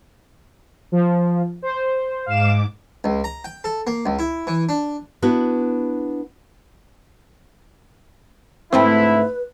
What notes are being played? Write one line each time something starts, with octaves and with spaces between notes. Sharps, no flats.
F3
C5
G#2 F5 D6 E7
C#2
A#5
G5
A4
A#3
C#2
E4
E3
D4
B3 D4 E4 F#4 B4
D2 G#2 A3 C4 E4 B4